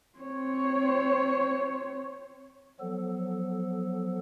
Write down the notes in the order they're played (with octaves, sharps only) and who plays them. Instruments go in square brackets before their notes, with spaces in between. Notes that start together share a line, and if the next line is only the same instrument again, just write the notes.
[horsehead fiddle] C4 C#5
[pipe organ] F3 F#3 B3 A4